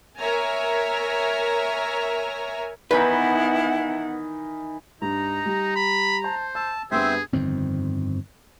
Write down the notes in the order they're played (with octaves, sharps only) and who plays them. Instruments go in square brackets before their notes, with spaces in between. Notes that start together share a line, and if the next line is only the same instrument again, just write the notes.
[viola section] A#4 C#5 E5 G#5 A#5
[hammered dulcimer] D#3 E3 D#4 [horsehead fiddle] B3 F#5 [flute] E4 [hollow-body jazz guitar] B4
[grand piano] G2 [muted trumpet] D#4 [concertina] A#5
[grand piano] G3
[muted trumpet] B5
[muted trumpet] C5 [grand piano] A5
[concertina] A5 [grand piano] E6
[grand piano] G2 B3 [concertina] C4 C5 E5 [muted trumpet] G#4
[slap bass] G1 F2 D#3 C4